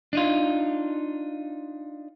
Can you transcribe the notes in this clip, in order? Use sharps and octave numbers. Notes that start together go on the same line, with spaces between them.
D4 D#4 F4